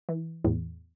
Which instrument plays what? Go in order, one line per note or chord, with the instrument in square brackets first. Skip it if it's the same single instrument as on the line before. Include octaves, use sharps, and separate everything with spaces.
[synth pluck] E3
[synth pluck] E2 [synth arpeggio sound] A2